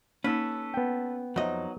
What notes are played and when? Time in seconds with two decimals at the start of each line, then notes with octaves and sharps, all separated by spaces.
0.24 A#3 C#4 D#4 A4 B4
0.74 B3 G5
1.36 F2 F#3 D#4 D#5 E5